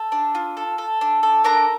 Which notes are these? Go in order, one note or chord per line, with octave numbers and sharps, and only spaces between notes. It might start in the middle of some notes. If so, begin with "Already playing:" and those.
Already playing: A4 A5
D4
F4
A4
A4
D4
A4
D4 A#4 A#5